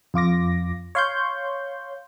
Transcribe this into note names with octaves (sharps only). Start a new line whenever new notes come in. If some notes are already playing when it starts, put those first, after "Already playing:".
F2 F4 D6 A#6
C#5 F5 C6 C#6 G6